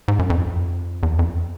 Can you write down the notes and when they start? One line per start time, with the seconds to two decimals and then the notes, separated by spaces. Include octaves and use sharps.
0.08 G#2
0.19 F#2
0.30 F2
1.03 E2
1.19 F2